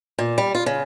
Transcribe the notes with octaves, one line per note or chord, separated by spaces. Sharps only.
A#2
G3
F4
C#3